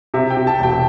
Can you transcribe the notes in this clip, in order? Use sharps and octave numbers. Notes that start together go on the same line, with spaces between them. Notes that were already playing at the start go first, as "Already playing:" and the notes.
C3 E5
G5
C3
A5
E1 G5